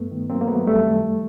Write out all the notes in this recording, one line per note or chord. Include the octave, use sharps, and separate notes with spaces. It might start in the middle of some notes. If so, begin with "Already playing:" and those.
Already playing: G2 A3 B3
D#3
F#3 A#3 C4
A#3
F#3 A3 B3
F#2 G3 A3
D#3
F2